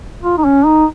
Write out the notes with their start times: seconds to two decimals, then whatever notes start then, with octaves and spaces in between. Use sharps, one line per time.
0.22 F4
0.38 D#4
0.45 C#4
0.66 D#4